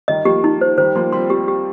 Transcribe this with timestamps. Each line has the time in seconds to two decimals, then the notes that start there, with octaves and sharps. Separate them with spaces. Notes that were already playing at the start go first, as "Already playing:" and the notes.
0.08 D#3 G3 D#5
0.25 F3 A#3 G4
0.44 D#4
0.61 C5
0.78 D#3 G3 C5
0.95 F3 A#3 C6
1.12 G3 C4 C6
1.30 G3 C4 G4
1.48 G4